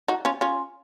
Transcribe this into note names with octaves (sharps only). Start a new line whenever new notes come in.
D#4 F#4
C#4 F4
C#4 F4